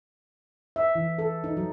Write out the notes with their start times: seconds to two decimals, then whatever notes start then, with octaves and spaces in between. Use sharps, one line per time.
0.76 E5
0.95 E3
1.19 A4
1.44 D#4
1.57 F#3